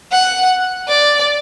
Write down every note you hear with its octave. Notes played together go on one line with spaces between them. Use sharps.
F#5
D5